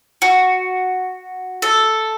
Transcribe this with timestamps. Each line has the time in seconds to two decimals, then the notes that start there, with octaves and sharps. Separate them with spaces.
0.22 F#4
1.62 A4